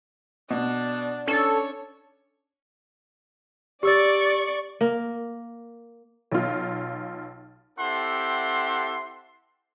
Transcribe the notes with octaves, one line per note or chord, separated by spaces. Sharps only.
B2 D4
C#4 D4 A4 C#5
G4 D5 C#6 E6 A6
A#3
B1 F4
C4 E4 G4 A4 F#5 C6